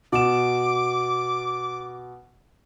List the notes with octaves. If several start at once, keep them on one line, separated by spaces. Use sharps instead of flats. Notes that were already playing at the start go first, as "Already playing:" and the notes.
B2 D6 E7